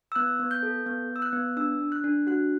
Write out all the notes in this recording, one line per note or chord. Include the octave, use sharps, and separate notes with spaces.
E6
B3 F#6
B3
G6
A4
B3 G6
B3
E6
F#6
B3
D4 E6
D4
F#6
D4
F#4 F#6